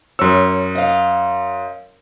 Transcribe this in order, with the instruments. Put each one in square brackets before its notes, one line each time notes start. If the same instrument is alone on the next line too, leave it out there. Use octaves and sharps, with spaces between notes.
[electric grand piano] F#2 E6 [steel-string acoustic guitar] C#5
[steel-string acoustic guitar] D#5 F5